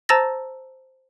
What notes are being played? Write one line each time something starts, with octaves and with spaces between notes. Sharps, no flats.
C5 A5 A#5 E6 A6 A#6